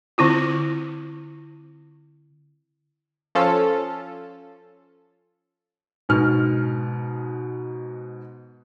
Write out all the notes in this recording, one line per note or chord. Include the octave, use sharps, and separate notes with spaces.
D3 C4 E4 F4
F3 C#4 F4 A4
G#2 B2 F6